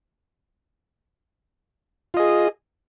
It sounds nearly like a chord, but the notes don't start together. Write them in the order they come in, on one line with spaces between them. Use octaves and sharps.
F4 D#5 G#4